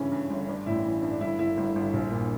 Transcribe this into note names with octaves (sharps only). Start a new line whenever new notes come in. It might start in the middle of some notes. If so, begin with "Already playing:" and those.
Already playing: G2 C#3 E3 C#4
G2
G1
G2 D4
A1 E4
E3
G2
D4
G1 E4
G1 E4
G1
G1
A#1
A#2